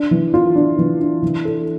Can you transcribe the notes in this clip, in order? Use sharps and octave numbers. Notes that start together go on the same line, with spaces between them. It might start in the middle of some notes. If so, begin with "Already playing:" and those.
Already playing: D4
E3
F4
D4
E3
D4
E3
A4